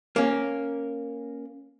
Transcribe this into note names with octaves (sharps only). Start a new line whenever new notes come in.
A#3 C#4